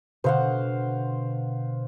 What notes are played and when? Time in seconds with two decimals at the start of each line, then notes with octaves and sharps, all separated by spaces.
0.24 B2 D3 C5 F5 F#5